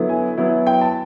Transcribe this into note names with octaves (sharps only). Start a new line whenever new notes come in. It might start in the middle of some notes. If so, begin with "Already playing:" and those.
Already playing: D3 F#3 B3 E4
G#5
F#3 B3 E4
G5
A5